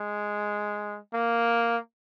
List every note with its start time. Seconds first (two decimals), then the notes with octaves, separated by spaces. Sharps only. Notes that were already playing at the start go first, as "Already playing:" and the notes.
Already playing: G#3
1.14 A#3